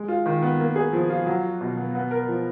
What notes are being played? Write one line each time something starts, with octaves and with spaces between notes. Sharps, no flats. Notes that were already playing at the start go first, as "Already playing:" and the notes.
Already playing: G#3
F4
D#3
B3
A#3
G#4
F3
F4
F#3
F#4
B2
B3
B3
A#4
F3